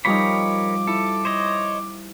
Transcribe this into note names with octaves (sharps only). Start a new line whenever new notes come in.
F3 G3 D#4 A#4 C#5 B5 D6
E4 A4
C5 C#5 D#5